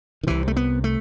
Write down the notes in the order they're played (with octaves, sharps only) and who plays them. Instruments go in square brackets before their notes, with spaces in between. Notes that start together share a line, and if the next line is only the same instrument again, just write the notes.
[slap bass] D#3
C2 C3 E3
A3
B3
A3